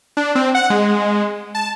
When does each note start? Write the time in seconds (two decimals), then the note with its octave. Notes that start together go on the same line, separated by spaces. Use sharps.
0.17 D4
0.35 C4
0.55 F#5
0.70 G#3
1.55 A5